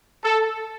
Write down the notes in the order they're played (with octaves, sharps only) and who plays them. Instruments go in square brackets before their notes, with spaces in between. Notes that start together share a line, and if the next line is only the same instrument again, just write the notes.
[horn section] A4